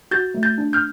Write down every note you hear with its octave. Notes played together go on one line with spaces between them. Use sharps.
F#4 G6 A6
A3
G6 A6
D4
F6 G6